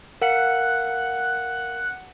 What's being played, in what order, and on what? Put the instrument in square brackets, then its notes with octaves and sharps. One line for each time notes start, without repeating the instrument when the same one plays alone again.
[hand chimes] A#4 F5 C#7 [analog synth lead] F#5